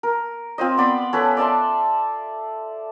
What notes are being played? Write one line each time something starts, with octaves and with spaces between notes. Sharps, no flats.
A#4
C4 F4 C5 D#5
B3 D5 B5 C6
C#4 A4 B4
D5 E5 A5 C6